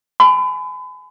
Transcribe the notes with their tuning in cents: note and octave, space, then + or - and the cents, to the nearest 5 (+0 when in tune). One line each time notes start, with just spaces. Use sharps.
G#5 +30 B5 +35